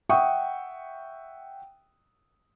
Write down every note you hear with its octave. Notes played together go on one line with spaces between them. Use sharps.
E5 F#5 G5 C#6 D#6